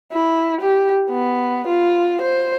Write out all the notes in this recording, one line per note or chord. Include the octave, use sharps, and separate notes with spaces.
E4
G4
B3
F4
C5